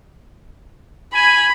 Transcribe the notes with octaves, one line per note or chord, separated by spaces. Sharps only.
G#5 B5